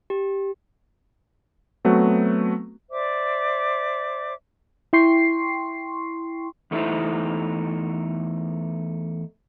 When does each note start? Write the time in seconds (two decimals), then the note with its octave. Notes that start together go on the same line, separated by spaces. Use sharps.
0.10 G4
1.85 F#3 A3 B3 C4 F#4
2.91 C5 D5 E5 D6
4.93 E4 G5 C6 C#6 C7
6.71 E2 A3 D#4 E4 C5